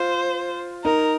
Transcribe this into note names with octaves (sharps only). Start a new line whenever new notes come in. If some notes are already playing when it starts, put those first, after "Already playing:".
Already playing: F4 C5
D#4 A#4